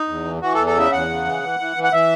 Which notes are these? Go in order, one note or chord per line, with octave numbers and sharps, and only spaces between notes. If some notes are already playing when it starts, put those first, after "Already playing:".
Already playing: D#4
E2
E3
E3 F#4
A4
E2
A4
C#3 E5
E2 F#5
C#3
E3
E3
E3
E3
F#5
E3 E5